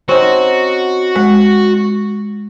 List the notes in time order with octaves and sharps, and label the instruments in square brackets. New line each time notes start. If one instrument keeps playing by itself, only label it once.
[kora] C4 C#4 D#4 [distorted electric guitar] F#4
[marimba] G#3 [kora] F#5